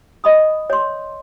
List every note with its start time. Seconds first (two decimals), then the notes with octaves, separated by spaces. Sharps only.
0.24 D#5 B5 D#6
0.70 C#5 C6